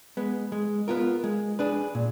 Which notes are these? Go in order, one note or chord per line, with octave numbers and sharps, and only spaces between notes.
G#3 B3
G#3
B3 F4 A#4
G#3
D4 G#4 B4
A#2